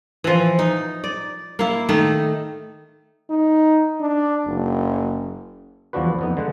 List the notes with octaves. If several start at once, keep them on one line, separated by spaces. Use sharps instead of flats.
E3 F3
D#4
D5
A#3 E4
D#3 A3 D#4
D#4
D4
F#1
E2 F3 G3 D4 F#4 B4
F2 B3 D#4
D3 G#3 F#5